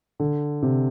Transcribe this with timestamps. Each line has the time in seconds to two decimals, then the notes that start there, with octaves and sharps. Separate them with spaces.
0.20 D3
0.62 C3